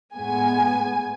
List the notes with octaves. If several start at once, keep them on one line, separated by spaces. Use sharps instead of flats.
A2 G#3 B3 G#5